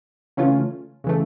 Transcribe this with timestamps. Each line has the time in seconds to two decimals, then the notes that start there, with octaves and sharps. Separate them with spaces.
0.37 C#3 E3 A3 C#4 F4
1.04 C#3 E3 A3